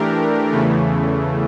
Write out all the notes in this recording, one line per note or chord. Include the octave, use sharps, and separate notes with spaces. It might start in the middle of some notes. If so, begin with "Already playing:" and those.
Already playing: E3 A3 D4 G4 A#4
E2 C#3 E3 A3